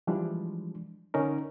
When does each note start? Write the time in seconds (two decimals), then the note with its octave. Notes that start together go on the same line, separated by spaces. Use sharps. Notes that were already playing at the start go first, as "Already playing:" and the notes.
0.07 E3 F3 G3 G#3 D4
1.14 D3 C#4 D#4 A#4